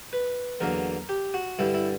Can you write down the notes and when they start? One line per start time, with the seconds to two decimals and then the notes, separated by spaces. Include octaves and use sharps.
0.13 B4
0.60 E2 D3 F#3 A#3 A#4
1.09 G4
1.34 F#4
1.59 G2 D3 G3 E4
1.74 E4